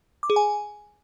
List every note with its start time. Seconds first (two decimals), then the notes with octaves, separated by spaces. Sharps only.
0.23 D6
0.30 G#4
0.36 G#5